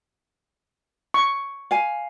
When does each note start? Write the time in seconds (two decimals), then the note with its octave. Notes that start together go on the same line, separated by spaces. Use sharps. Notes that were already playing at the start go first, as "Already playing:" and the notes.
1.14 C#6
1.71 F5 G#5